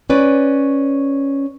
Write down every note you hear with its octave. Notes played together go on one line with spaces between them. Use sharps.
C#4 B4 D5